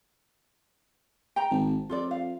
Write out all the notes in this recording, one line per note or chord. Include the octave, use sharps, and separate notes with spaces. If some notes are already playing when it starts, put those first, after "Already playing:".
G5 A#5
G#1 A5
F2 F4 A4 D5
F5